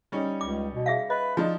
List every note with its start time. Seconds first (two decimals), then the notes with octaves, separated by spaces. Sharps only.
0.12 G3 C#4 D#4
0.41 C#2 D6
0.73 B2
0.86 G#4 E5 F5
1.10 B4 D#5
1.37 F3 D4 D#4